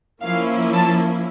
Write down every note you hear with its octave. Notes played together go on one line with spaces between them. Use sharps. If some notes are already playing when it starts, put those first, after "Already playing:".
F3 A#3 C#4 E4 F5
A5